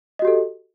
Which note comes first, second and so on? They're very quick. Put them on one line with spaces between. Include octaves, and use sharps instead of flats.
D#5 F#4 G4 A4